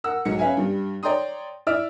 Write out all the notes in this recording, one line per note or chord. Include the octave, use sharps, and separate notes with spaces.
A#4 F#5 E6
B1 G#2 F#3 C#7
C#4 B4 E5 F5 G#5
G2 G3
C#5 D5 G5 A#5 C6 D#6
E4 D5 E5 E6 F6 D7